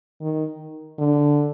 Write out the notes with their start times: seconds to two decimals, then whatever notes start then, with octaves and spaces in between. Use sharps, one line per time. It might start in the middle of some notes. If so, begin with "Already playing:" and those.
0.21 D#3
0.98 D3